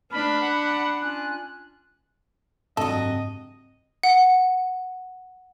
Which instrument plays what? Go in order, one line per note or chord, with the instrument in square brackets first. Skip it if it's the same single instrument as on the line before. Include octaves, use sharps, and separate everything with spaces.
[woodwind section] A3 B4 F6 [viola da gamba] D4 [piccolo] B5
[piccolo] F#5 [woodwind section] B5
[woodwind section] C#4 F4 G#5 [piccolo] F#6
[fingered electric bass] F#1 G#2 D4 [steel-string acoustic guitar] C3 F#4 [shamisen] A4 [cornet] D#5
[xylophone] F#5